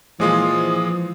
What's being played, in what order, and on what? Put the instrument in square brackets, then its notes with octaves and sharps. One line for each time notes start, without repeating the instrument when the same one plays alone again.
[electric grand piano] A#2 G#3 F4 [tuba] E3 [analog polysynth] F3 [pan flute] D#6